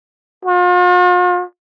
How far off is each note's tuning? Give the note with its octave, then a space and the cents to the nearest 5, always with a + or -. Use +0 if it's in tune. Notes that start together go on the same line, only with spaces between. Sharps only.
F4 +45